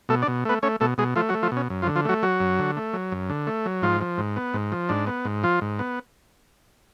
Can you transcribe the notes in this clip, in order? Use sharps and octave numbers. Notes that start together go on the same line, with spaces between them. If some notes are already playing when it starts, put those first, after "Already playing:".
B2 A3 A4
D4 D5
B2
A3 B3 B4
A3 C#4 C#5
B2 A3 A4
B2 G#3 G#4
F3 A3 F4
F#3 F#4
A3
F3 F4
B2
C#4
F#2
F3 F4
D3
F3 F4
F#3 A3 F#4
F#3 F#4
F#2
D3
A3
F#3
F#2
D3
A3
F#3
G#2 F3 F4
F3
G#2
B3
G#2
F3
G#2 D4
B3
G#2
F3 F4
G#2
B3